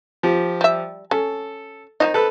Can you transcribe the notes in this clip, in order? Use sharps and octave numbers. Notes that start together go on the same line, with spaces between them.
F3 G4
G3 E5
C#4 A4
D#3 D#4 C5 D#5
A4 B4